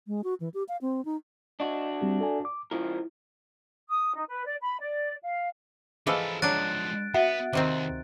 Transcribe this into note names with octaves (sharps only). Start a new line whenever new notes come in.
G#3
F#4
E3
G4
F5
C4
D#4
D4 F#4 D#5
G3 C4 G4
A4 D5 G#5
D6
C#2 F3 E4 A#4
D#6
D#4
B4
D5
B5
D5
F5
E3 F3 F4 G#4 A4 B4 D#5 E6
F3 F#3 G#3 D4 F#6 A6 D7
B3 F#4 E5 F#5
D#2 C3 D#3 C4